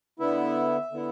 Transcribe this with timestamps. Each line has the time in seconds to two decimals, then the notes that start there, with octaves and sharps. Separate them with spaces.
0.19 D3 B3 E4 E5
0.91 D3 B3 E4